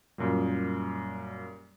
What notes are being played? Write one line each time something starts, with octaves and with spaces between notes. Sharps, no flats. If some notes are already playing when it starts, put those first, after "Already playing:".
F#2 A#2 G3